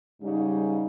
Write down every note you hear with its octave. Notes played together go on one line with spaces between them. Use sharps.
G#2 C#3 G3 D#4